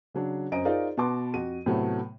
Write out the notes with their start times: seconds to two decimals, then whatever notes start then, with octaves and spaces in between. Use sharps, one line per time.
0.14 C#3 F#3 D4
0.52 F#2 C4 D#5 A#5 D7
0.65 D#4 F4 G#4 A#4 C5 D5
0.97 B2 F#4 B4 A5 C6 D6
1.34 F2 F#4 D#7
1.66 A2 C3 F#3 A3 B3